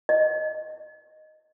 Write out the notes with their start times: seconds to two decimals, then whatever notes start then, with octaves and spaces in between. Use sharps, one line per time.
0.09 D#5